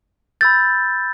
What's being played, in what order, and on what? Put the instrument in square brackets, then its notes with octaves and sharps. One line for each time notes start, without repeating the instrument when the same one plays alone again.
[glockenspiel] B5 E6 G6 A6